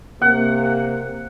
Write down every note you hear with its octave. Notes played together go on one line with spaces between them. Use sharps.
C3 A#3 F#5